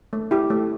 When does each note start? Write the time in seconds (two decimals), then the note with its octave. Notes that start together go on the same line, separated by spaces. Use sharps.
0.13 A3
0.31 E4 G4
0.50 A3